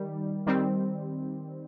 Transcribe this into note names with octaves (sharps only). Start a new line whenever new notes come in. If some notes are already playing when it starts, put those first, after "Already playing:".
Already playing: D#3 G3
D#3 G3 C4